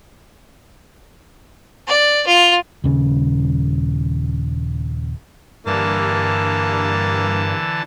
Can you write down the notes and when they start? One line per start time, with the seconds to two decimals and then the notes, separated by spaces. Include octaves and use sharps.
1.88 D5
2.27 F4
2.84 D#1 C#3
5.66 G2 D3 E3 A#3 A5